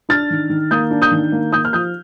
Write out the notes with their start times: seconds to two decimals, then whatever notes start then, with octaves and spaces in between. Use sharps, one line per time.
0.09 D4 F6 A6
0.30 D#3
0.50 D#3
0.71 A#3 D#6 G6
0.91 D4
1.02 D#6 G6
1.11 D#3
1.32 A#3
1.52 A#3 D#6 G6
1.65 F6
1.73 F3 D#6 G6